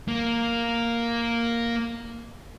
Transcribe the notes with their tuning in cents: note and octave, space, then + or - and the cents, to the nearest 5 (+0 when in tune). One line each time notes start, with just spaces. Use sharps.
A#3 +0